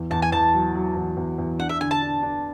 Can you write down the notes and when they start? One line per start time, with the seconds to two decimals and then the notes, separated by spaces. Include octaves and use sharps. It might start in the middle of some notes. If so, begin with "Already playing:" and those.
Already playing: E2
0.11 E2 A5
0.22 G#5
0.32 E2 A5
0.53 F#3
0.75 F#3
0.95 E2
1.17 E2
1.38 E2
1.59 D4 F#5
1.69 E5
1.80 D3 G#5
1.91 A5
2.02 D4
2.23 D4